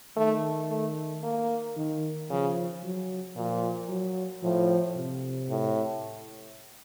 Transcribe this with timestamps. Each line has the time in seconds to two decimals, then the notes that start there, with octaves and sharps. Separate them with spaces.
0.16 D#3 A3
0.69 A3
1.23 A#3
1.76 D#3
2.30 C#3 F3
2.84 F#3
3.36 A#2 F3
3.89 F#3
4.43 A2 F3
4.96 C3
5.50 A2